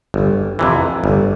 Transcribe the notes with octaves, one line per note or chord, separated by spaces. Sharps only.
G1
F2 C3 E3
G1